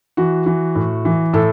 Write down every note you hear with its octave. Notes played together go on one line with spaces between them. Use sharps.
E3 F#4
E3
A2
E3
A2 A4